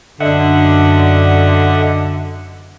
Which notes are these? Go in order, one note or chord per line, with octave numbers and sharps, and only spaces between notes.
F#2 D3 D#5 E5 F#5